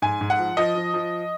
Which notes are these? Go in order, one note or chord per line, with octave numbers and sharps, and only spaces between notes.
G#2 G#5
G#2
F#5
F3
F3 D#5
F3
F3